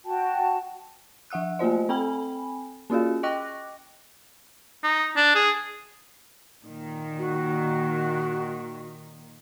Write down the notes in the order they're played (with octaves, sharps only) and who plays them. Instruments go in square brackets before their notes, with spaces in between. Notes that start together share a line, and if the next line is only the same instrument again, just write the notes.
[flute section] F#4 G5 A5
[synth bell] F3 E5 F#5 E6 F#6
A3 A#3 F4 C5 D#5
C4 A4 G5 G#5 B5
A#3 C#4 F4 F#4 G#4
D#5 G5 C#6 D6 F#6 A#6
[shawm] D#4
D4
G#4
[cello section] A#2 D#3
[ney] F#4